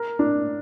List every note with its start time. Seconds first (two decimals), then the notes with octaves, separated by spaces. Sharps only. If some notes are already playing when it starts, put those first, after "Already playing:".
Already playing: A#4
0.19 D4